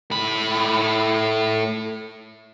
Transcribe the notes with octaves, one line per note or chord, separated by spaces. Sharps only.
A2 B5